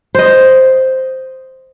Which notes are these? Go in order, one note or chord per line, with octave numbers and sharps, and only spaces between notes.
C5 D#5